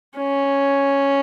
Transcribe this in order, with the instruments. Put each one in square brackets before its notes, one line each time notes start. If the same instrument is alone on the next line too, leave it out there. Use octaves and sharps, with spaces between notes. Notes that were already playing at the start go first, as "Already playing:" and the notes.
[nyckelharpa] C#4